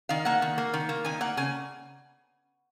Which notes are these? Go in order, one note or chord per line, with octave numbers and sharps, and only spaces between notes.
D#3 F5
A#3 F#5
D#3
A#3
D#3
A#3
D#3 G#5
A#3 F#5
C#3 G#5